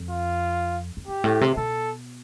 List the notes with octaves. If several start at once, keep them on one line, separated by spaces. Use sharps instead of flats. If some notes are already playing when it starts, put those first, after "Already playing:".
Already playing: F2
F4
F2
G2 G4
A2
C3
B2 A4